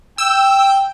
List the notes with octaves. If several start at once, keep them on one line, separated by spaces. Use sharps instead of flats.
G5 E6